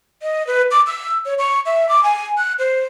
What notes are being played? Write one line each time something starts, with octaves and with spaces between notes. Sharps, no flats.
D#5
B4
D6
E6
C#5
C#6
E5
D6
G#5
F#6
C5